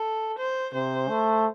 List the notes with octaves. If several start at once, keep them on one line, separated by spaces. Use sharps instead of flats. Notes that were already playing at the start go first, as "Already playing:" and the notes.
Already playing: A4
C5
C3 C5
A3